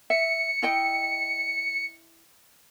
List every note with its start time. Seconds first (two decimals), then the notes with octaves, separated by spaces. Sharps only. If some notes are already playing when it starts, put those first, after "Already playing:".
0.10 E5 C#7
0.62 E4 D#5 G5